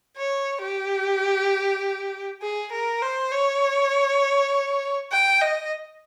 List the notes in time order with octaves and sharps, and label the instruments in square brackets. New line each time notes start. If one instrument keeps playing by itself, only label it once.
[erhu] C#5
G4
G#4
A#4
C5
C#5
G5
D#5